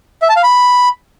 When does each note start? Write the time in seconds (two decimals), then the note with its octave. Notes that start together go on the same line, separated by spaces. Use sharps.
0.22 E5
0.29 A5
0.36 F5
0.43 B5